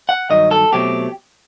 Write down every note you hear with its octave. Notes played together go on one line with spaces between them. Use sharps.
F#5
G2 D#3 F#3 D#5
A4
B2 F#3 A3 C4 G4